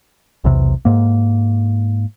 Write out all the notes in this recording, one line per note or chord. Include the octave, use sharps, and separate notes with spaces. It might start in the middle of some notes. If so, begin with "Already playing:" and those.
B1 E2 C3
G#2 A#3